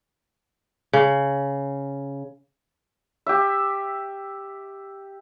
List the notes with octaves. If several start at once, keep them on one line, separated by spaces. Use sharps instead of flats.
C#3
G4 E5